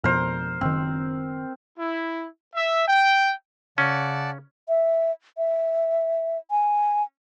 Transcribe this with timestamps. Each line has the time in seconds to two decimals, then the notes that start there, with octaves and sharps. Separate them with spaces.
0.04 F2 B2 A#4 C5
0.61 F#1 D#3 C4
1.78 E4
2.56 E5
2.87 G5
3.78 C#3 C#4 D5 F#5 A5
4.68 E5
5.38 E5
6.51 G#5